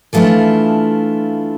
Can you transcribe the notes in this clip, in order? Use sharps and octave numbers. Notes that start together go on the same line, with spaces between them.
E3 F3 A3 D4 E4 F4